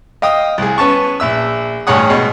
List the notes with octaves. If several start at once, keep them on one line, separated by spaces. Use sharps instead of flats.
D#5 F5 G5 D#6
C2 G#4
B3 C#4 A5 C#6
A#1 E5 E6
A1 G2 G#4 C#5 F#5 D#6
B2 G#3